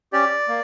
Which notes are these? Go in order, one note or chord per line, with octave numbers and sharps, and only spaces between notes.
C#4 G4 D5
A#3